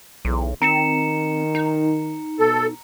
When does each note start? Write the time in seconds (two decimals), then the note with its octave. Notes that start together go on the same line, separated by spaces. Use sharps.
0.25 B1 E2
0.62 D#3 C4 A#5 C#7 E7
1.55 D#4
2.39 B2 A4